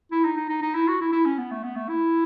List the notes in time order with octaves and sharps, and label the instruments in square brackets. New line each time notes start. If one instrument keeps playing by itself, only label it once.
[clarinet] E4
D#4
D#4
D#4
D#4
E4
F#4
E4
E4
C#4
B3
A3
B3
A3
E4